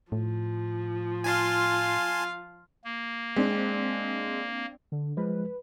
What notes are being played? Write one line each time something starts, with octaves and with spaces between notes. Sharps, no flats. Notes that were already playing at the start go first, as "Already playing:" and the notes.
A2 F3
F4 F5 G#5 A5 C6
A#3
G#3 C4 D4
D3
F3 G#3 B4